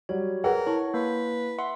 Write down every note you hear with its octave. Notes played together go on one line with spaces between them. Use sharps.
F#3 G3 C#5
G#4 A#4 B4 F#5 G5
E4 C#5 A5 C#6
A#3 B4
E5 F#5 C6